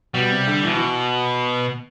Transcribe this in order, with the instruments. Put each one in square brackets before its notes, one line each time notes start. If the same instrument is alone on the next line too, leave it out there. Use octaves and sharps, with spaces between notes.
[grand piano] B2 [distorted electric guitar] G3
[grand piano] C3
D3
[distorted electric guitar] B2 [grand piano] E3
[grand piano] E3